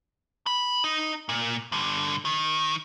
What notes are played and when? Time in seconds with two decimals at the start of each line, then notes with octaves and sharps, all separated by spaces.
0.46 B5
0.84 D#4
1.29 A#2
1.72 G2 D3
2.25 D#3